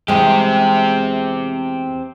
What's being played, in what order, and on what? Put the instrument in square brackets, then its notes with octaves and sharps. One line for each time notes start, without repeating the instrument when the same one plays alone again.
[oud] E2 G#3 [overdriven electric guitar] C4 G4